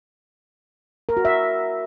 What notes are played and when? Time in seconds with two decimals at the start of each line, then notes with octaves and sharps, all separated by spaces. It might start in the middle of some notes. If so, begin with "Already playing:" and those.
1.09 A#4
1.17 F#4
1.25 E5